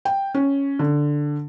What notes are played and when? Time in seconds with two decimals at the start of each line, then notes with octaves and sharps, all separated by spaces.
0.05 G5
0.34 C#4
0.79 D3